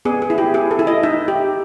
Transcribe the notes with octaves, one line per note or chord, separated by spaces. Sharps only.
B3 G#4
G#4
E4
G4
E4 G#4
A4
E4
D#5
D#4 E5
G4